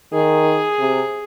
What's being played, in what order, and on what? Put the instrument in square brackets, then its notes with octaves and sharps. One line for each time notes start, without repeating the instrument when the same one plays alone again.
[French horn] D#3 [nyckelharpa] G#4
[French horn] C3